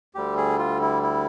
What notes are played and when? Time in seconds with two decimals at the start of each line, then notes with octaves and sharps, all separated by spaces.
0.15 D2 D3 G3 G4
0.37 G#4
0.59 F4
0.81 E4
1.03 E4